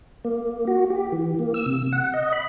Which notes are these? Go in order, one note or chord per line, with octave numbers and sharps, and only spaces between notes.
A#3
F#4
G4
E3
A#3
E6
C3
F#5
D#5
B5